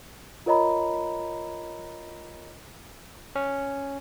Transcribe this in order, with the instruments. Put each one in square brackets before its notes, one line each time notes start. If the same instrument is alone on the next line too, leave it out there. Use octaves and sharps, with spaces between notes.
[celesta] F4 A#4 C#5 D#5 A#5 B5
[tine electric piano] C#4